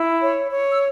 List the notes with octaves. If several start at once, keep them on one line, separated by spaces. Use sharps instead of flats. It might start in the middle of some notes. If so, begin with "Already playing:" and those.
Already playing: E4
C#5
C#5
E6